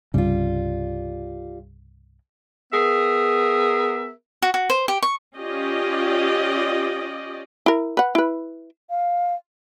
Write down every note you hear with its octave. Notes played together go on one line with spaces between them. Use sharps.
C2 G2 C#3 G3 F4
B3 G#4 A#4 E5
F#4
F#4
C5
G4
C#6
C#4 F4 G4 D5 D#5
E4 A#4
B4 F#5
E4 B4
F5